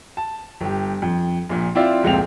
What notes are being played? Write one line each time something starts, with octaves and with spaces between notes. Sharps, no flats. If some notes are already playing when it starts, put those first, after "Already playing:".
A5
G1 G4
F2
A#1 A#2
C4 E4 F4 D5 E5 F5
F1 C#2 A#2 C4 F7